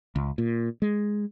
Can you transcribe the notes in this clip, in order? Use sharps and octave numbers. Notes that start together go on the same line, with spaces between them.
C#2
A#2
G#3